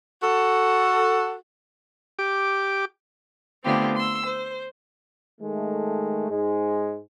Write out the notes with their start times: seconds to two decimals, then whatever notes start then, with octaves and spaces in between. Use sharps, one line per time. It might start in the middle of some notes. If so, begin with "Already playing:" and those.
0.21 F#4 A4
2.19 G4 D6
3.64 D3 A3 B3 C4 F4 G4
3.96 C6 E6
4.25 C5
5.41 D#3 G#3 A3
6.30 G#2 G#3